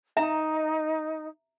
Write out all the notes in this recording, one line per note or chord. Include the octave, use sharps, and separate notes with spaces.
D#4 E5 A#5